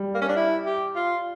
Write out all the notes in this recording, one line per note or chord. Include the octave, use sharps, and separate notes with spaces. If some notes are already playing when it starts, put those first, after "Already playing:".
Already playing: G3
A#3
C#4
D4
E4
G4
F4